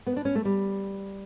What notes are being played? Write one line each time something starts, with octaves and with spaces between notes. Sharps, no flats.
B3
D4
C#4
A3
G3